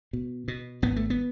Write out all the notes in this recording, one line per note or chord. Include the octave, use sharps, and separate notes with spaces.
B2
B2
G#1 B3
A3
B3